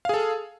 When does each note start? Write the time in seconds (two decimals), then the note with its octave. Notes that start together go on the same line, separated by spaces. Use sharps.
0.05 F5
0.09 G#4
0.14 A4